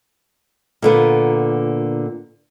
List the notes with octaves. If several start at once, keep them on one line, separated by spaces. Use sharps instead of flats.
A#2 D3 B3